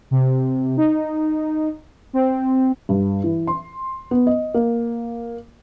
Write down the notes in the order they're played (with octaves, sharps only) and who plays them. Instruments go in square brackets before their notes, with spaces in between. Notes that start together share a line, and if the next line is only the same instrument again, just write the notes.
[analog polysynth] C3
D#4
C4
[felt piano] G2
E3
C6
B3
D#5
A#3